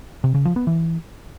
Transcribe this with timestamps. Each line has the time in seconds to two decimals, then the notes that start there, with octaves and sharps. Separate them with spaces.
0.24 C3
0.35 C#3
0.45 F3
0.56 B3
0.67 E3